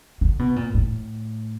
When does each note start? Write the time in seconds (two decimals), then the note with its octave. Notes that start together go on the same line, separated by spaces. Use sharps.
0.21 D3
0.39 B2
0.56 A#2
0.75 A2